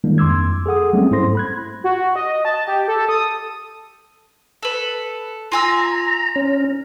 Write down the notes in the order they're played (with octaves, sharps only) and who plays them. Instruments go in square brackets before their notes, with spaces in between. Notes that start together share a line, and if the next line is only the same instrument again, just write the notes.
[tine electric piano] D#3 G3 G#3 A#3 D4 E4
F2 C6 D6 E6 G#6
G#4 A4 F#5 D#6
F#3 G3 A3 A#3 C4 C#4
G#2 E4 A4 C5 C6 A#6
B5 F#6 G#6
[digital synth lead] F#4
D#5
A5
G4
A4
D#6
[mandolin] A4 B4
[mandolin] F4 G#5 E6 [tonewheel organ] A#5
[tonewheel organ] C#4